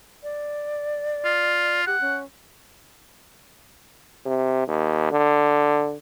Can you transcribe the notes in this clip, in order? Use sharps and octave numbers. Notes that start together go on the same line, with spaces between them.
D5
F4
G4 F#5
C#4
C3
D#2
D3